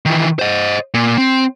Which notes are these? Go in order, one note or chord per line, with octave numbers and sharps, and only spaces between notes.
D#3 E3
C5 D#5
A#2
C4